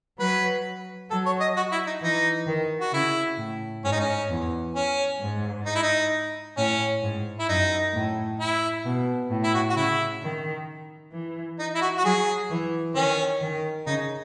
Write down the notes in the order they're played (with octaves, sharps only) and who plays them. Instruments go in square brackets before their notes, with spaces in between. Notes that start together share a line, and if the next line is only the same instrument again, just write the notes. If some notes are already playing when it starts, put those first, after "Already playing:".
[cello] F#3 [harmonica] B4
[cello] F#3 [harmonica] A4
[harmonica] C#5
D#5
F#4
E4
D#4
[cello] E3 [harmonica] D#4
[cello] D#3
[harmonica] F#4
[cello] C#3 [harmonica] E4
[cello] A2
[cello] G#2 [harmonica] C#4
[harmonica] D#4
C#4
[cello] E2
[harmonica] C#4
[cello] G#2
[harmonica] D#4
E4
D#4
[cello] A2 [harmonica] C#4
[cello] G#2
[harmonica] E4
[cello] F#2 [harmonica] D#4
[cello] A2
[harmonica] E4
[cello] B2
A2
[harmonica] E4
F#4
F#4
[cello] C#3 [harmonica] E4
[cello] D#3
E3
[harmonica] D#4
E4
F#4
F#4
[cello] F#3 [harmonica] G#4
[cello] E3
[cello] D#3 [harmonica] C#4
[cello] D#3
[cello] C#3 [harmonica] D#4